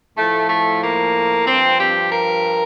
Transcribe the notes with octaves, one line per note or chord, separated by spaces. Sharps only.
A2 F3 A3
A3
A#3
G2 F3 C4
G4
A#4